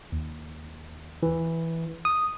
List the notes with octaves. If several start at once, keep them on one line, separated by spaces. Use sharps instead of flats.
D#2
E3
D#6